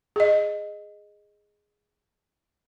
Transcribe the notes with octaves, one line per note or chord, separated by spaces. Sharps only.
G#4 D#5